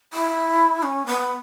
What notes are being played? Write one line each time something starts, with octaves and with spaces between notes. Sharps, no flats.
E4
C#4
B3